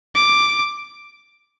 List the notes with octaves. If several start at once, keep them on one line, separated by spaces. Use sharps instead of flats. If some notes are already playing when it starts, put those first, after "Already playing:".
D6